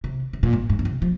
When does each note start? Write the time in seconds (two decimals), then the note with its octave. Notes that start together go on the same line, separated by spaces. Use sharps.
0.04 C3
0.33 C3
0.43 A#2
0.53 G#2
0.70 G#2
0.79 C#3
0.85 C3
1.02 F3